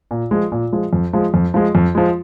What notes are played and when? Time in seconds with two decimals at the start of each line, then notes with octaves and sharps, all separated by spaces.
0.11 A#2
0.31 F3 G#3
0.52 A#2
0.73 F3 G#3
0.93 F2
1.13 F3 G#3
1.34 F2
1.54 F3 G#3
1.75 F2
1.95 F3 G#3